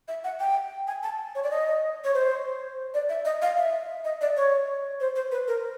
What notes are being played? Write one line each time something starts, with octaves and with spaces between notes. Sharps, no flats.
E5
F#5
G5
G#5
A5
C#5
D5
D#5
C#5
C5
D5
E5
D#5
F5
E5
D#5
D5
C#5
C5
C5
B4
A#4